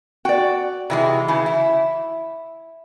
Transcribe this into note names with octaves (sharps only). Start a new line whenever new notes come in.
F#4 D5 G5
C3 E3 G#3
C#3 E3
E4